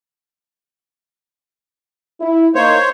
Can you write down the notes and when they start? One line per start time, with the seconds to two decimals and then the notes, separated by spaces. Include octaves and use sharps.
2.21 E4
2.55 A#3 D#4 C5 C#5